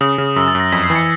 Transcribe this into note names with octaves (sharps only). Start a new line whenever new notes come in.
C#3 D#6
C#3
F#2 E6
A6
F#2
A#6
F2 B6
C7
E3
C#7